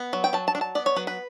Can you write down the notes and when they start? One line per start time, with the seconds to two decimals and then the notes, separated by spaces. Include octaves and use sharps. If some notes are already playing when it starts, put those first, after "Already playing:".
Already playing: B3
0.13 F#3
0.24 G5
0.33 F#3 A5
0.48 A5
0.55 D4
0.61 A5
0.75 B3 D5
0.86 C#5
0.96 F#3 B4
1.07 B4